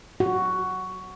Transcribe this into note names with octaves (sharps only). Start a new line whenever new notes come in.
F#4